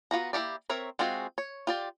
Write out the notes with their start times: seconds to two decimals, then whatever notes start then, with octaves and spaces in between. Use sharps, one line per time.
0.11 B3 F4 F#4 A#5
0.33 A#3 E4 F#4 G4 D5
0.70 C4 A#4 C#5 E5
0.99 G#3 C4 F4 F#4 G#4
1.38 C#5
1.67 F4 G4 D5